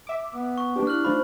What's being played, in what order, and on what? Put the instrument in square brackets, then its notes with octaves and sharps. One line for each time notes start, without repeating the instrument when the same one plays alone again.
[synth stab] E5 D6
[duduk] B3
[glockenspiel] C#6
[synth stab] A#3 G4 [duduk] D4 [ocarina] B4
[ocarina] E4 [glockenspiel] F6 F#6 F#7
[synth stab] A3 D#4 F4 [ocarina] C5 [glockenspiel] B5